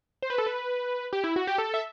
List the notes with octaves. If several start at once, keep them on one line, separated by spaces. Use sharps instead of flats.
C5
B4
A4
B4
G4
E4
F#4
G4
A4
E5